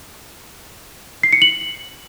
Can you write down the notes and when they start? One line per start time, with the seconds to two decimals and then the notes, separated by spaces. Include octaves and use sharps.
1.23 C7
1.33 C#7
1.42 F#7